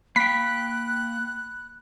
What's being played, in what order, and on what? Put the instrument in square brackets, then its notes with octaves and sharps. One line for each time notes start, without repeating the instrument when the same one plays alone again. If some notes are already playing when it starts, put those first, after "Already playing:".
[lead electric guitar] A#3 G5 [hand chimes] B5 [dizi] F#6 [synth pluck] B6